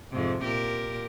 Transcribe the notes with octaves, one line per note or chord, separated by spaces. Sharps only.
F2 G#2 C3
A#2 G4 A#4